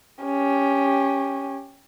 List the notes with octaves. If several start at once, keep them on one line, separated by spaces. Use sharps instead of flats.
C#4 G4